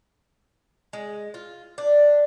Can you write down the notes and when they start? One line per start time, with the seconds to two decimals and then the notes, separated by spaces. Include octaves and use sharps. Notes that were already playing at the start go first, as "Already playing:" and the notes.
0.93 G#3
1.34 F4
1.78 D4